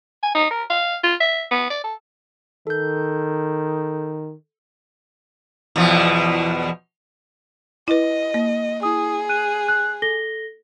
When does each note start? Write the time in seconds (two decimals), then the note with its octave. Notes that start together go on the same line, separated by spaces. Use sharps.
0.23 G#5
0.35 D#4
0.51 A#4
0.70 F5
1.03 F4
1.20 E5
1.51 B3
1.70 D5
1.84 A4
2.67 D#3 A4 G6
5.76 E2 B2 F3
7.88 E4 B4 D#5
8.34 A#3
8.83 E4 G#4 D#6
9.29 F#6 D#7
9.69 F#6
10.02 A4 A#6 G7